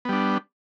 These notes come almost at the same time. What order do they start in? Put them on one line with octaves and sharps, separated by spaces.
B3 G3 D4